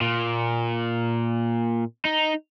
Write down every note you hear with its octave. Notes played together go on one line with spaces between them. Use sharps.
A#2
D#4